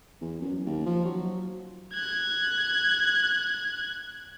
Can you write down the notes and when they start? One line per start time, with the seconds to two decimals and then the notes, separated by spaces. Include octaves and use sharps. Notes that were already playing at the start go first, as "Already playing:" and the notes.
0.22 E2
0.42 F#2
0.66 D#2
0.86 F3
1.05 F#3
1.93 F#6 G#6